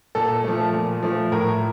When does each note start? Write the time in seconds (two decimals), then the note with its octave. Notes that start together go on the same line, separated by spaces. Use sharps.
0.15 A#2 A4
0.44 F3 A3
0.73 A#2
1.03 F3 A3
1.32 A2 A#4